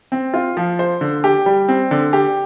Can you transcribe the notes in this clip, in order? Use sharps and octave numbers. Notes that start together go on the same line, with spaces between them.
C4
F4
F3
C5
D3
G4
G3
C4
D3
G4